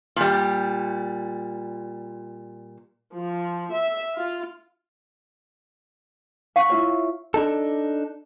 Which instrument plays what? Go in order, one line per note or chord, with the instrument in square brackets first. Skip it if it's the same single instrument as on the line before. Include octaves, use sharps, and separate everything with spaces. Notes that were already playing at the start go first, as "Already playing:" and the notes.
[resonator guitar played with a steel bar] A#2 G3
[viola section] F3
E5
F4
[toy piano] F5 [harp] F#5 C#6
[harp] E4 F4 C#5
[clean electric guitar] D4 D#4 A4